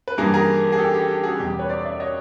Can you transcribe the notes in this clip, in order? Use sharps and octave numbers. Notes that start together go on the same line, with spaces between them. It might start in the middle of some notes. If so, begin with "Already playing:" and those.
B4
G2 E3 G3 A#3 G#4 A#4
G#4 A#4
G#4
G4 A4
G4
G4
F#4 G#4
E2 B2 G3 G4
G4
B4 C#5
C5 D5
D5 E5
C#5 D#5